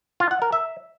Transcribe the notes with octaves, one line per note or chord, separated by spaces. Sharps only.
F4
F#5
A#4
E5